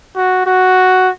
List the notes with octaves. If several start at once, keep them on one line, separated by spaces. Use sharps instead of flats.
F#4
F#4